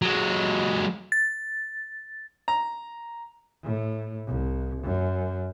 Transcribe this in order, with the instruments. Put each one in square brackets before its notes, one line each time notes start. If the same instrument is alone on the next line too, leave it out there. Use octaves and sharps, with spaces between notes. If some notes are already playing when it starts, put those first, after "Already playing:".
[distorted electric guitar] F#3 G#3
[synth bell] A6
[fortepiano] A#5
[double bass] A2
C2
F#2